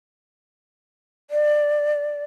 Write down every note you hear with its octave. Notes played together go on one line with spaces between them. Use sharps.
D5